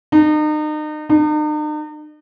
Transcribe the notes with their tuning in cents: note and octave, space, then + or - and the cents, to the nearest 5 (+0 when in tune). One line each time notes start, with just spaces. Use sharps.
D#4 -35
D#4 -45